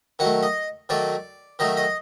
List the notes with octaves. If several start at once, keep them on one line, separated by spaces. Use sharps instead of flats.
D#3 F#3 A3 F#5
D#5
D#3 F#3 A3 D5
D#3 F#3 A3 D#5
D#5